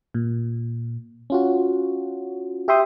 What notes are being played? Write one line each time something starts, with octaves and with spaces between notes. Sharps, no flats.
A#2
C#4 F4 F#4
G4 E5 G5 C6 D#6